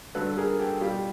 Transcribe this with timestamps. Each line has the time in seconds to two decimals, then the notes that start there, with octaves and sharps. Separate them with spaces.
0.15 G2 D3 F#3 A4 B4
0.37 G#4 A#4
0.59 G4 A4
0.81 B2 G3 F4 G4